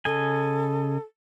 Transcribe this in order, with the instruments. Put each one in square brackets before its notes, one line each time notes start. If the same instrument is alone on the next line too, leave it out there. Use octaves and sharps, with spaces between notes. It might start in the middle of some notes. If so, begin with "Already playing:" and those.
[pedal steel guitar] C#3 D#5 G#5 [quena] A4